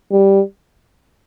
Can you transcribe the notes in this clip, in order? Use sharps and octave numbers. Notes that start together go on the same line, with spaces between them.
G3